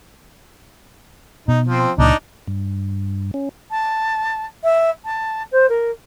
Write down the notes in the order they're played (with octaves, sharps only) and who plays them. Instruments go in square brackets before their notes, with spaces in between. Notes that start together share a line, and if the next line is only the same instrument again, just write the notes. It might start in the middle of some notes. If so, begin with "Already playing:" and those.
[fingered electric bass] B2 [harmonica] D#4
[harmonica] F3 C4
[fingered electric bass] C#2 A#2 [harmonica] D4 D#4
[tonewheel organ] G2
C#4
[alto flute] A5
E5
A5
C5
A#4